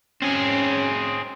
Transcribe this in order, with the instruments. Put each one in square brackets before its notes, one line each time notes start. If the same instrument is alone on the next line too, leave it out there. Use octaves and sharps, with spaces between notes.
[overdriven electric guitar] C4 G#4 [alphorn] C#4